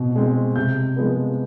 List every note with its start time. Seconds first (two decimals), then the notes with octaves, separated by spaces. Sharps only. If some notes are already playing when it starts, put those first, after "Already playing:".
Already playing: B2 C4
0.15 G#3 C4
0.56 C3 G6
0.96 F3 G#3 B3